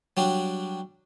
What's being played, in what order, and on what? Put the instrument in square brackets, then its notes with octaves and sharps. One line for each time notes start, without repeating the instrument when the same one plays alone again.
[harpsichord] F#3 G3 D4